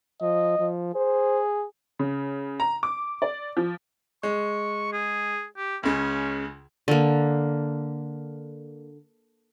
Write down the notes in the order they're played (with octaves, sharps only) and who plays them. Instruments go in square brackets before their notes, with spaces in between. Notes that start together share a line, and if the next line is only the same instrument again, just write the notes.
[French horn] F3 [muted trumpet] D#5
[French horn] F3
[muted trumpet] G#4 [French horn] C5
[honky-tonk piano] C#3
A#5
D6
D5
F3
[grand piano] G#3 [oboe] C#6
[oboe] G#4
G4
[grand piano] C#2 C#3 [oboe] C#4
[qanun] D3 A#3